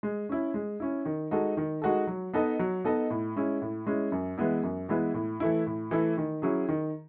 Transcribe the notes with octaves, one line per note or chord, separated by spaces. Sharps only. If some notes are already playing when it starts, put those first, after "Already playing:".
G#3
C#4 E4
G#3
C#4 E4
D#3
G#3 D#4 F#4 A4
D#3
G#3 D#4 F#4 A4
F#3
B3 D#4 A4 D#5
F#3
B3 D#4 A4 D#5
A2
G#3 C#4 E4
A2
G#3 C#4 E4
F#2
E3 G#3 B3 E4
F#2
E3 G#3 B3 E4
A2
E3 A3 E4
A2
E3 A3 E4
D#3
F#3 C#4 E4 G#4
D#3